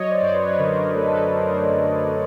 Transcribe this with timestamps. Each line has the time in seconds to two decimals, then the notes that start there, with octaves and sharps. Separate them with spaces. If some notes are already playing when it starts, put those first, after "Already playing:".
Already playing: F#3 C#5 D#5
0.09 C5 D5
0.22 F#2
0.33 B4 C#5
0.58 D3 A#4 C5
0.95 A3 A4 B4
1.31 F#3 A#4 C5
1.68 F#2
2.06 D3